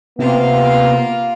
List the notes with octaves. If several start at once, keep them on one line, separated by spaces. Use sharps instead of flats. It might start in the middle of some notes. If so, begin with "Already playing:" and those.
C3 A#3 B3 F4 F5